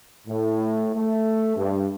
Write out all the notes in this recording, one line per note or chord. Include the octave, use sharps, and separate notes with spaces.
A2
A3
G2